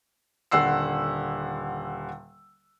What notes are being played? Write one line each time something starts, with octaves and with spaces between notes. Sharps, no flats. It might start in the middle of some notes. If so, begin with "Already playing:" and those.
D#1 D3 F#5 E6 C7